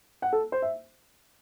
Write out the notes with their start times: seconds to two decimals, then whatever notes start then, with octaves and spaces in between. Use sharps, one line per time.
0.22 F#5
0.33 A4
0.52 C5
0.62 E5